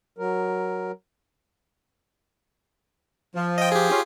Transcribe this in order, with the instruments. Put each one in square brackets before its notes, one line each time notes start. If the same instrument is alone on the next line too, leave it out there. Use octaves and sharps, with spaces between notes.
[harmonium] F#3 A#4
[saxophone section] F3
[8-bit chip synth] D#5 G5
G4 G#4
[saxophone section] C#4 F4